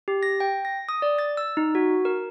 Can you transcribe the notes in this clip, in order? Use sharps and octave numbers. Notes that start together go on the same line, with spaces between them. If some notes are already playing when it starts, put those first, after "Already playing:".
G4
A#6
G5
A#6
D#6
D5
A6
E6
D#4
F#4
A#4